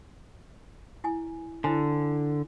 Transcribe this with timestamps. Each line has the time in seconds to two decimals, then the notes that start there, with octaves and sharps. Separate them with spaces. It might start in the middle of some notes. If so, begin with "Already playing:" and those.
1.04 E4 G#5
1.64 D3 E4 C5 G#5